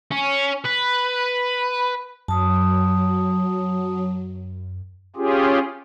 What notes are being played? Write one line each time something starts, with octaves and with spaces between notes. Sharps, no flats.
C#4
B4
F#2 F#3 A5 D#6
C#4 F4 G4 G#4